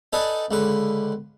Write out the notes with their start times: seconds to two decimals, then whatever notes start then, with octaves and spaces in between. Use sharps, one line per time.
0.13 D#4 A4 B4 D5 G#5 D#6
0.51 C#2 D3 B4